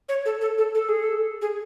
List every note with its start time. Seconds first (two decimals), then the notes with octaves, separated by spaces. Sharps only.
0.09 C#5
0.26 A4
0.41 A4
0.58 A4
0.75 A4
0.89 G#4
1.03 A4
1.42 G#4